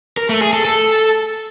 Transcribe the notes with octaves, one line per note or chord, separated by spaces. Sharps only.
A#4
A3
G#4
A4
A4